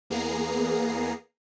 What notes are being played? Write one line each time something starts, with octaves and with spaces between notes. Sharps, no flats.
E2 A#3 B3 G#4 A#5 C7